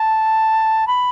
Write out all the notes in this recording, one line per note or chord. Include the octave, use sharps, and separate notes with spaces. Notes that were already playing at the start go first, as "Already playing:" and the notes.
Already playing: A5
B5